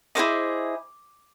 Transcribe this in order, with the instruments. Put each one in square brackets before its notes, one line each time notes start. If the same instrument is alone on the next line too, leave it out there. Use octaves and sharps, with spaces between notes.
[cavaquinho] E4 G#4 C5 D#5 D6